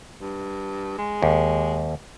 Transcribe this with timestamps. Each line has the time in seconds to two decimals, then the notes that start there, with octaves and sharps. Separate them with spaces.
0.21 G2
0.98 G#3
1.23 D#2